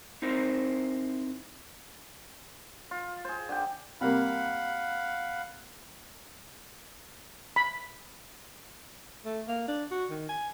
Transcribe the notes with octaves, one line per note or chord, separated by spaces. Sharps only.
C4 D#4 E4 A#4 C5
F4
G#4 C5
D3 G4 G5
C3 G3 A#3 F5 F#5 B5
B5
A3
A#3
D4
F#4
D#3
G#5